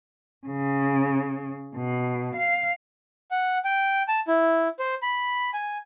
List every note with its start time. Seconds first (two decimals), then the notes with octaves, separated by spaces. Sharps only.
0.47 C#3
1.77 B2
2.37 F5
3.31 F#5
3.65 G5
4.08 A5
4.28 E4
4.79 C5
5.02 B5
5.54 G#5